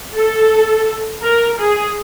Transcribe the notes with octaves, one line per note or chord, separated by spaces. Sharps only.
A4
A#4
G#4